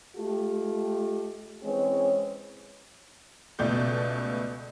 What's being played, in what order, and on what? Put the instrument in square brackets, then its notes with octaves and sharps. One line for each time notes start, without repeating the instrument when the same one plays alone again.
[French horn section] G#3 A3 F4 G4
E3 G#3 C4 C#4 G#4 C#5
[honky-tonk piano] C#2 B2 A3 D5 G6